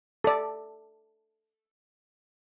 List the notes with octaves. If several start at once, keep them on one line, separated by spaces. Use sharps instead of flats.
A4 D5